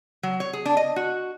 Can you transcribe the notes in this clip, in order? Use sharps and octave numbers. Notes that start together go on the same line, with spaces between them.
F#3
C#5
G#4
D4
D#5
F#4